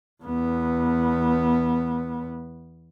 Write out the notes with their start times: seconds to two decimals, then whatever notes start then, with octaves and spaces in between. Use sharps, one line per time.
0.24 E2 B3